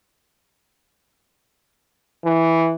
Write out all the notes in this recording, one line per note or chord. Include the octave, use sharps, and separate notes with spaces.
E3